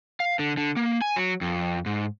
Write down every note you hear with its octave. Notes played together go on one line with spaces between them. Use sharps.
F5
D3
D3
A#3
G#5
F#3
F2
G#2